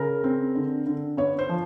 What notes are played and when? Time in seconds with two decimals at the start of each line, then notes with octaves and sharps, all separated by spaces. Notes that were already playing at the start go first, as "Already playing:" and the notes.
Already playing: C#3 A#4
0.24 C4
0.55 D3
0.86 D3
1.17 B3 C#5
1.39 C5
1.49 F3